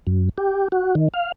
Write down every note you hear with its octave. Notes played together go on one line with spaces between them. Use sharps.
F#2
G4
F#4
D#3
F5